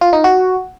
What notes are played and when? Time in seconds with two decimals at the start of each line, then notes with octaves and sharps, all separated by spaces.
0.01 F4
0.13 D#4
0.24 F#4